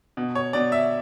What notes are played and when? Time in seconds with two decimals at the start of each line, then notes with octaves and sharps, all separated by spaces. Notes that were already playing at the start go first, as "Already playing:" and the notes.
0.17 B2
0.35 C#5
0.53 B2 D5
0.72 E5